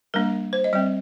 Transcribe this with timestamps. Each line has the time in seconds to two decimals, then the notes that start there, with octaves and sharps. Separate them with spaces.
0.14 G3 A#3 D4 A#4
0.53 C5
0.64 D#5
0.73 G3 C4 D5